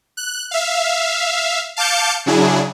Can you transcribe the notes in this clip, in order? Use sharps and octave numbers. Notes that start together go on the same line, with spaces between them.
F#6
E5 F5
F5 A5 D6 G6 C#7
C#3 F#3 D4 E4 G#4